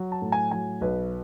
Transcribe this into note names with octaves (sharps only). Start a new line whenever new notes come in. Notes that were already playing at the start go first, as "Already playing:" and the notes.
Already playing: F#3
A5
A2
G#5
F#3 G#5
B1 B4